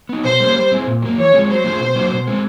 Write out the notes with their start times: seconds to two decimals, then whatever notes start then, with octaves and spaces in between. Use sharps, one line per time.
0.09 B3 D#4
0.24 B2 C5
0.40 G3 A#3 C#4
0.55 G3
0.71 C4 E4 G#4
0.87 A#2
1.02 F#3 A#3
1.18 E3 C#5
1.34 G#3 C4 F4 G#4
1.49 F#3 C5
1.64 A3 D4 F4 G#4
1.80 B2
1.96 F#3 A#3 D4 F#4
2.12 B2
2.27 G#3 C4